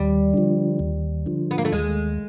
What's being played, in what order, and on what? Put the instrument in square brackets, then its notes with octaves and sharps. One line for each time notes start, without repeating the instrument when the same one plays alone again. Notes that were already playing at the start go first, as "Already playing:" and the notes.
Already playing: [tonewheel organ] D#2 [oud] G3
[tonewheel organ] D3 F3
D#2
D3 F3
[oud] B3
A#3
A3
[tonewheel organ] D#2 [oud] G#3